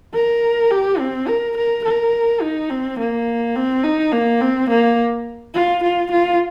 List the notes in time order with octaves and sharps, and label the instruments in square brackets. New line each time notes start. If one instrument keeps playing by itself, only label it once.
[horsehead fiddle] A#4
G4
C4
A#4
A#4
A#4
D#4
C4
A#3
C4
D#4
A#3
C4
A#3
F4
F4
F4